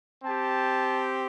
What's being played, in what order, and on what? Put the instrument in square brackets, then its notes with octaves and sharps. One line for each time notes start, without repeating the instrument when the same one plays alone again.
[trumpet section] C4 G4 A5